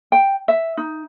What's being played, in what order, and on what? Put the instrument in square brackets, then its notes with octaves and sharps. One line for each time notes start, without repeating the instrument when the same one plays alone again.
[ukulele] G5
E5
D#4